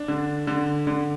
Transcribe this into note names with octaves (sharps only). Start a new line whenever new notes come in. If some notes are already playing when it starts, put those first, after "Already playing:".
Already playing: D4
D3
D3
D3